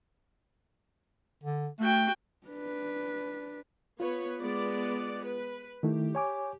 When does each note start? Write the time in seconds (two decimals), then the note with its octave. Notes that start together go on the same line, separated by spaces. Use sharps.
1.43 D3
1.80 A3 F#4 G5
2.47 D4 B4
4.00 B3 F4 B4 C#5
4.40 G#3 B3 D5
5.24 B4
5.83 D#3 A3 E4 G4
6.15 C#5 G#5 D6